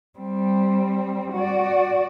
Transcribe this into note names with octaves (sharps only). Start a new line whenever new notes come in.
G3 C4
F#4 D5